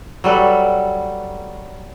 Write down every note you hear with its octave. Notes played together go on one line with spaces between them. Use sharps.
F#3 G3 A4 B4